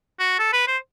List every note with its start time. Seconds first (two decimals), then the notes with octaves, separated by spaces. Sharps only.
0.20 F#4
0.39 A4
0.53 B4
0.68 C5